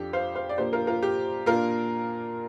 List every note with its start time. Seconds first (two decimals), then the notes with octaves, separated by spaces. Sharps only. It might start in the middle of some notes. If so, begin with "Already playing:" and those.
Already playing: F2 F3 D4 G4
0.13 C5 F5
0.35 C5 F5
0.49 D5
0.57 A#2 F3 A#3 D4 G4 C5
0.73 F4 A#4
0.87 F4 A#4
1.03 G4
1.46 A#2 A#3 D4 F4 A#4